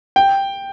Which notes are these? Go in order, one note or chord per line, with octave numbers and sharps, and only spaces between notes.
G5